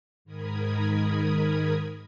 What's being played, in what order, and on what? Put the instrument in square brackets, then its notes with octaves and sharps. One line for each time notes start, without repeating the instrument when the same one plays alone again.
[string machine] G#2 D#3 A#4 B5 D#6 G#6